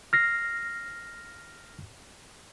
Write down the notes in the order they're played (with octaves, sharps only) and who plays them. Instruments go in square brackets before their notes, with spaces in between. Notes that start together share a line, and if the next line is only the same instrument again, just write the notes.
[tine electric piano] F6 A#6 C7